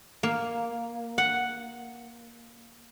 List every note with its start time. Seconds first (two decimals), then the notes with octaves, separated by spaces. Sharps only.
0.23 A#3
1.18 F#5